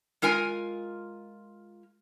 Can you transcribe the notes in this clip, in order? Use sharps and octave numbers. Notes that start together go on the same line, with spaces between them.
G#3 F4 A#4 G#5